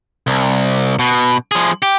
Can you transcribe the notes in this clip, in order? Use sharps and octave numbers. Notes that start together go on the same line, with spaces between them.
C2
B2
F3 G#4
G4